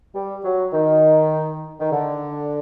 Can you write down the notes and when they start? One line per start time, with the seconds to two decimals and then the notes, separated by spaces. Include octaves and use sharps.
0.14 G3
0.44 F#3
0.73 D#3
1.80 D#3
1.91 D3